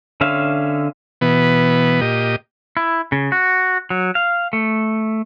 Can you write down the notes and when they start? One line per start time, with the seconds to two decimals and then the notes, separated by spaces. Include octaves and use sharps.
0.21 D3 C#4 E5 F5
1.21 B2 E3 B3
2.01 A#2 G4 D#5
2.77 E4
3.12 C#3
3.32 F#4
3.90 F#3
4.15 F5
4.53 A3